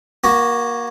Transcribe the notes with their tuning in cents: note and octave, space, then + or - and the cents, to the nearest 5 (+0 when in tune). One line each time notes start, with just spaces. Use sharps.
A#3 +25 F#4 +0